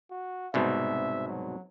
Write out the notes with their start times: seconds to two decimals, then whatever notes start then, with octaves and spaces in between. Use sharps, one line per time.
0.11 F#4
0.54 C2 G#2 B2 E5
1.28 F#3